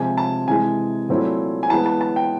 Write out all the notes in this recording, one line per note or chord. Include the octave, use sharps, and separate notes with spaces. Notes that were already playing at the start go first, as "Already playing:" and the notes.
Already playing: C3 F3 G#3 G#5
A5
C3 E3 G#3 G#5
A#2 F#3 A3 C4 E4
G#5
E3 G#3 B3 A5
A5
A5
G5